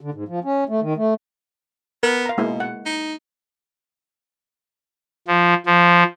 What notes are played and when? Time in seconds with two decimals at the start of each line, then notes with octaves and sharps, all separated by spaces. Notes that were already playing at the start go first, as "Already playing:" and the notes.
0.01 D3
0.14 G#2
0.28 F3
0.44 C#4
0.69 A3
0.82 D#3
0.97 A3
2.03 B3 A#4
2.26 F5 A#5
2.38 B2 G#3 A#3 E4
2.60 F#5
2.86 D#4
5.27 F3
5.66 F3